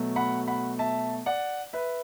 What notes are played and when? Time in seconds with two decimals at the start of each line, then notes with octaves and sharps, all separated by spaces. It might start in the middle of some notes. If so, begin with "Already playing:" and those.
Already playing: B2 F#3 A3
0.16 F#5 B5
0.47 F#5 B5
0.79 E5 A5
1.26 D5 F#5
1.73 B4 E5